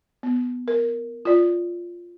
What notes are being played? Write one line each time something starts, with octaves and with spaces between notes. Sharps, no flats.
B3
A#4
F4 D5